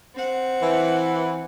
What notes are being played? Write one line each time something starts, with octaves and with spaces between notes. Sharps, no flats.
C4 F#5
E3